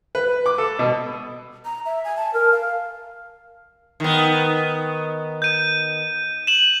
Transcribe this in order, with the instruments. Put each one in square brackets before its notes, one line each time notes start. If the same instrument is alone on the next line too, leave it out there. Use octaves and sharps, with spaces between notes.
[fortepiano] B4
D6
A4
B2
[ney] A#5
E5
G#5
A5
A#4
F5
[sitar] D#3 B3
[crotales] G6 D#7
E7 F#7